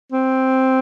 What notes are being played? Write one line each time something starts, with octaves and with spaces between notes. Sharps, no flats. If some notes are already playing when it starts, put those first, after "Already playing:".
C4